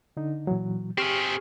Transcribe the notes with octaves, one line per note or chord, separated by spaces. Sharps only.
D3 D#4
A#2 E3 F#3
C4 G4 G#4 C#6 F6